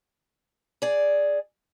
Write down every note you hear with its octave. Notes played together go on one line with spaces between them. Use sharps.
G#4 D5